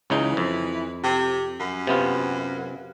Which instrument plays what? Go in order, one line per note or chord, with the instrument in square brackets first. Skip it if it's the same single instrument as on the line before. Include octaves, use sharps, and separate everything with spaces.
[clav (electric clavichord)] C#2 C#3 D#4 [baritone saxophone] E3
[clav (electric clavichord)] F2
[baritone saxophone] C3
F#2
[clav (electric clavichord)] C3 B3 F4